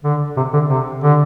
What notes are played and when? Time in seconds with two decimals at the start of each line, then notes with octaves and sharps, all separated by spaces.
0.04 D3
0.37 C3
0.54 D3
0.69 C3
1.04 D3